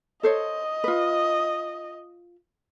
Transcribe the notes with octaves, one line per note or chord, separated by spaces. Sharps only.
A4 C5 C#5 D#5
F4 B4